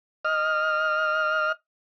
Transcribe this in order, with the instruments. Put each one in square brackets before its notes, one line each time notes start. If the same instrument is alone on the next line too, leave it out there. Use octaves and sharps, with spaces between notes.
[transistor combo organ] D#5 F6